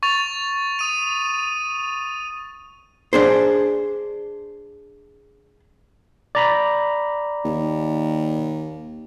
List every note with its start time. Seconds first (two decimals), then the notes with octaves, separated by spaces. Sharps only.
0.03 C#6 A6 F7
0.79 D#6 D#7
3.13 D4 G#4 C5
6.35 D5 A#5 B5
7.44 D#2